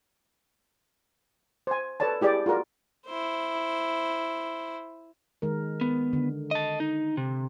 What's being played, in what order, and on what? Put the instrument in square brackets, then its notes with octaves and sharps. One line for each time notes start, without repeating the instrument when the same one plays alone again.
[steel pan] C5 G#5
A4 B4 C#5 D5 A5
E4 G4 G#4 D5
F4 F#4 G#4 A#4 D5
[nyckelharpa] E4 C5
[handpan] D#3 G#3 A#4
[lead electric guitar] B3
[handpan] D3
[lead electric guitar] D#5 A5
D#4
C3